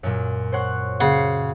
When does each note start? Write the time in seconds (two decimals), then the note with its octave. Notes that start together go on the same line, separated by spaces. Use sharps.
0.03 F#2 A#2
0.52 C5 C#5 F#5
1.00 C#3 F#5 C7